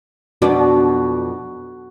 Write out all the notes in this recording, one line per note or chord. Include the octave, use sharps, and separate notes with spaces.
F2 B2 D4 F#4